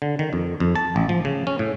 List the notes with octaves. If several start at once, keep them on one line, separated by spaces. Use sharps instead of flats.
D3
D#3
F2
F2
A5
A1
F3
C#3
C#4
A2